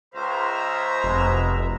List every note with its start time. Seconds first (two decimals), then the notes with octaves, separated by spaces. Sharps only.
0.14 C#2 C5 E5 A#5
1.04 F1 B2 G#3